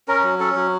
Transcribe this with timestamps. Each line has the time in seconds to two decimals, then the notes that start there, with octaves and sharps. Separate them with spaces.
0.08 C#4 A#4
0.24 F#3
0.40 C#4 A4
0.56 F#3